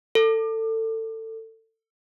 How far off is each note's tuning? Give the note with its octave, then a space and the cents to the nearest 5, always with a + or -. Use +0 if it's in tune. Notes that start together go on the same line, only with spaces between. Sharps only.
A4 +25